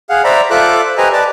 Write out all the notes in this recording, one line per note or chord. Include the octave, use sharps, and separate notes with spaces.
G#4 F5 F#5
C5 D5 E5 A#5 B5
F4 A4 C5 E5 D6 F#6
G4 B4 C5 D#5 G#5 A#5
B4 D5 A5